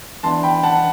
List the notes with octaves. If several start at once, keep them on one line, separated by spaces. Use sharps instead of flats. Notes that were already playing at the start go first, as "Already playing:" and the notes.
E3 B3 D4 A5 C6
G5 B5
F#5 A5
F#5